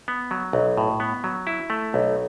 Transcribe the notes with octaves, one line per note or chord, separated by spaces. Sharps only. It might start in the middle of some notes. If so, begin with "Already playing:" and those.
B3
F#3
B1
A2
B3
F#3
E4
A3
B1